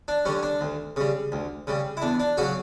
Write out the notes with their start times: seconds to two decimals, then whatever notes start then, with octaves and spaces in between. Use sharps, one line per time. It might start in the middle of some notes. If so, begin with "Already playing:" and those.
0.08 D4
0.25 D3 G3 C#4
0.43 D4
0.61 D2
0.96 C#3 G3
1.32 D2
1.67 C#3 G3
1.97 E4
2.02 E2 D4
2.20 D4
2.37 C#3 F#3 F#4